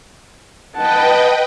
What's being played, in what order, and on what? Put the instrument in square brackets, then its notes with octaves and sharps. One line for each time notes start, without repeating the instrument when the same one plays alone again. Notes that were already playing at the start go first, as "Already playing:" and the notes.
[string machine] B4 D#5 G5 [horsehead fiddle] F#5 A5